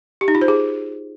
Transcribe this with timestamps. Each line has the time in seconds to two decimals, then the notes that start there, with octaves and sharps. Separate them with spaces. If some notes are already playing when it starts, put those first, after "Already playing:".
0.21 G4
0.28 D#4
0.35 F4
0.41 C5
0.48 G#4